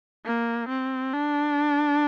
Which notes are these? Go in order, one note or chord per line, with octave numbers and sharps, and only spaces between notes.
A#3
C4
D4